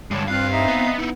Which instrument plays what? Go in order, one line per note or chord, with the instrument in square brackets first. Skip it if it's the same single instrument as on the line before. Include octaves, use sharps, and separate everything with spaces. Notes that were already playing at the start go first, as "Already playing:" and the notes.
[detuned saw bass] G2 [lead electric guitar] D3 G#3 [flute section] C#5 A5
[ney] C4 [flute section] F4 F#6 [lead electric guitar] F5
[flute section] D#4 E5
[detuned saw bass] B3
[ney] B3 [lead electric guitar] D#4 E4